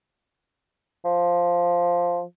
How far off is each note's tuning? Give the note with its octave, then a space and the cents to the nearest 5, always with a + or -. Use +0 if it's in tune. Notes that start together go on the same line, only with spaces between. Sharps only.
F3 +0